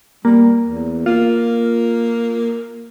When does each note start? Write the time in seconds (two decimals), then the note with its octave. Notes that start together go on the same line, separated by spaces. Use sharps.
0.25 G3 A#3
0.66 E2
1.06 A#3 F4